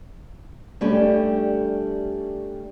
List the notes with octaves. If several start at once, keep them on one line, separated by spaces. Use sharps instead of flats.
G3 A3 C#4 D4 G4 A4